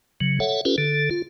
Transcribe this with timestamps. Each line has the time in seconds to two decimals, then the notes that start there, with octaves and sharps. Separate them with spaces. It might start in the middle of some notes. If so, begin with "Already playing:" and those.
0.21 C#3 F#3
0.40 A4 C#5 E5 F#5
0.65 C#4 F4 G4 A4 B4
0.78 D3 A4
1.11 F4